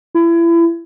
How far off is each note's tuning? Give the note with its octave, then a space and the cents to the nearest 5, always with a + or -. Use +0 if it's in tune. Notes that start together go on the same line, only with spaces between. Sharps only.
E4 +30